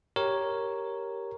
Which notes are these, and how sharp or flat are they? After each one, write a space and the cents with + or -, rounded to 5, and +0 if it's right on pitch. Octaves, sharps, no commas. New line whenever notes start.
G4 +0 A#4 +0 C#5 +0